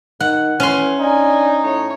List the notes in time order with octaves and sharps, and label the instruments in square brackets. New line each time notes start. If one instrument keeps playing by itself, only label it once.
[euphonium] D#3 [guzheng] F#5
[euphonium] E3 [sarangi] A3 [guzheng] C#4 C6
[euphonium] D4 [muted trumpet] D#4 [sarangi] G#5
[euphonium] A2 [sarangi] C#5